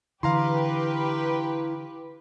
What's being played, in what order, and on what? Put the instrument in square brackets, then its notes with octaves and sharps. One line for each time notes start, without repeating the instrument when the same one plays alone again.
[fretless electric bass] D3 E3 [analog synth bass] E4 [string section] G4 B4 [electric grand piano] F5 A#5 C6